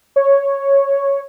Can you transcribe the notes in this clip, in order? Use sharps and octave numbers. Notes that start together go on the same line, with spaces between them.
C#5